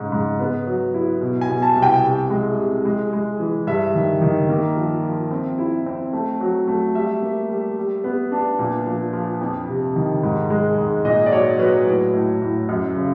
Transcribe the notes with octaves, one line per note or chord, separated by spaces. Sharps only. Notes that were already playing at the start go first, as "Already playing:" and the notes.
Already playing: G#2 C#3 G#3
G#2
B3
F#3
E4
B2
G#5
B2
A5
C2
G5
C3
G#3
C3
G#3
G#3
E3
G2 E5
D#3
D#3
A#3
F3
F3
C4
E4
C4
A3
F#3
A3
G3 E5
A#3
G3
G3
B3
D4
A#2
F3
F3
F2
C3
D#3
G#2
G#3
G#2
A#2 D#5
D5
F#3 C#5
F#3 B4
A2
A2
A2
F#2
C#3